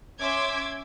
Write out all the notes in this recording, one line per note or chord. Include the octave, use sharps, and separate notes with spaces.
C#4 E5 C6 D6 G#6